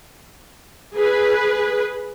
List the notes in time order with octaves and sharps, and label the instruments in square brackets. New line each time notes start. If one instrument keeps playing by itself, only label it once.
[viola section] G#4 B4